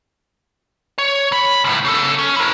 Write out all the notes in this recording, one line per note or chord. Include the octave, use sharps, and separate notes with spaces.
C#5
E3 B5
C#2 A2
C#3 A4
C#4
E4 A#4